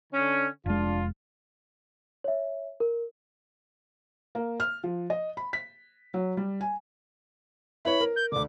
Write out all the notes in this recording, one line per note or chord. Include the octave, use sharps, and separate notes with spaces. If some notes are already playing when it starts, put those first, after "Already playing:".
D3 C#4
F1 G#3 D4 F4
C#5 E5
A#4
A#3
F6
F3
D#5
B5
B6
F#3
G3
G#5
E4 B4 C#5 B5
A#4
G6
D2 D3 D6